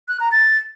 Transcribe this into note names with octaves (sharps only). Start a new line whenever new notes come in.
F#6
A#5
A6